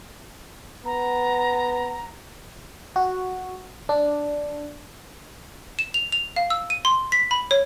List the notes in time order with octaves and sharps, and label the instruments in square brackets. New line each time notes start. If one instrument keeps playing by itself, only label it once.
[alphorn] B3 [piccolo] A#5
[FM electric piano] F#4
D4
[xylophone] E7
F7
F7
F5
E6
D#7
C6
B6
B5
C#5